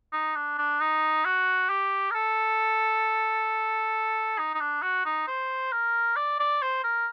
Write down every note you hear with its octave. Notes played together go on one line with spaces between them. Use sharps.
D#4
D4
D4
D#4
F#4
G4
A#4
A4
D#4
D#4
D4
F#4
D#4
C5
A#4
D5
D5
C5
A#4